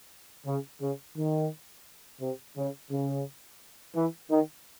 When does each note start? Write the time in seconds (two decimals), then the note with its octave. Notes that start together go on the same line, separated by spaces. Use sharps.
0.46 C#3
0.81 C#3
1.16 D#3
2.21 C3
2.57 C#3
2.91 C#3
3.96 E3
4.31 D#3